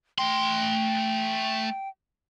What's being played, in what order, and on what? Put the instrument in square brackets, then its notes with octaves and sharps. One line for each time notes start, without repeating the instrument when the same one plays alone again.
[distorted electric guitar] A3 C6 [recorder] G5